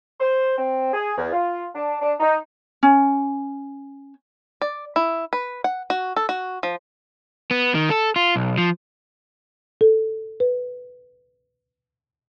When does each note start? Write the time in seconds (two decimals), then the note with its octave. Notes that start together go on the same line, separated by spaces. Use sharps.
0.19 C5
0.57 C4
0.92 G#4
1.17 E2
1.32 F4
1.74 D4
2.01 D4
2.19 D#4
2.83 C#4
4.62 D5
4.96 E4
5.33 B4
5.64 F#5
5.90 F#4
6.16 A4
6.29 F#4
6.63 F3
7.51 B3
7.75 D#3
7.90 A4
8.16 F4
8.36 B1
8.58 F3
9.81 A4
10.40 B4